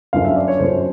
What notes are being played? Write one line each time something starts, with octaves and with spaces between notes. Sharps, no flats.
G1 F#2 D3 F5
E5
D5
C#5
G1 F#2 D3 C5